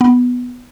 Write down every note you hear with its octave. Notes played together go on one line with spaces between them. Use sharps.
B3